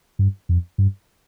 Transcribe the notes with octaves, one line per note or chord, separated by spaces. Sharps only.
G2
F2
G2